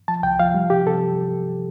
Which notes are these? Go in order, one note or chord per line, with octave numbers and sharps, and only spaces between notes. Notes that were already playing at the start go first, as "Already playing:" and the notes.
F3 A5
C2 G5
F3 F5
G3
C3 G4
C3 A4